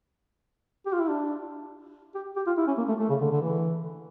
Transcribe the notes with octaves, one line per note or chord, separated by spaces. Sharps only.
G4
F4
E4
D4
G4
G4
F4
E4
C#4
A#3
A3
A3
C#3
D3
D3
E3